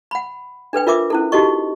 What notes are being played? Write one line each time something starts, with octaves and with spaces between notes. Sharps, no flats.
F#5 B5
D4 A4 B4 G5
F4 A#4 E5 D6 D#6
C#4 E4 A4
D#4 F#4 G4 A4 D#5 C#6